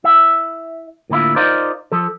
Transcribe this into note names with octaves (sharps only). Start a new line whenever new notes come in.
E4 E5
A2 D3 A#3 E4 F4
D#4 F4 A#4 C5 D5
F3 A4